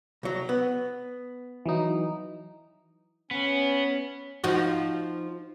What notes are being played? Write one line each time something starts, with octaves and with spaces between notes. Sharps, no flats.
C2 F#3
B3
E3 F#3 D#4
B3 C#4
F3 D#4 F#4